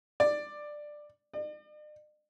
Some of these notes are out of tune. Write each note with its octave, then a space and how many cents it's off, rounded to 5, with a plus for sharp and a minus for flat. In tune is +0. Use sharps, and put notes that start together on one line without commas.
D5 +10
D5 +45